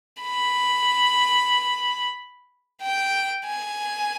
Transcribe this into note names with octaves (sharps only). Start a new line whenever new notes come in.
B5
G5
G#5